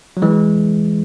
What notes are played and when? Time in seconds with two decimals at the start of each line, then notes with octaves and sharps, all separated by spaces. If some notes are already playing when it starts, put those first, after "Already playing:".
0.17 F#3
0.22 E3 G#3